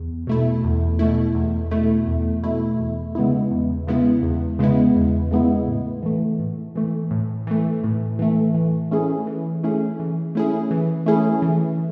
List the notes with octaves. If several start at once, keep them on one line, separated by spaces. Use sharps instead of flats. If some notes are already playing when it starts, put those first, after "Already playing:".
Already playing: E2
B2 A3 E4
E2
B2 A3 E4
E2
B2 A3 E4
E2
B2 A3 E4
E2
C#3 G#3 B3 E4
E2
C#3 G#3 B3 E4
E2
C#3 G#3 B3 E4
E2
C#3 G#3 B3 E4
A2
E3 A3
A2
E3 A3
A2
E3 A3
A2
E3 A3
E3
A3 C#4 E4 G#4
E3
A3 C#4 E4 G#4
E3
A3 C#4 E4 G#4
E3
A3 C#4 E4 G#4
E3